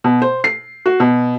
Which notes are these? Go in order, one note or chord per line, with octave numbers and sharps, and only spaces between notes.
B2
C5
C7
F#4
B2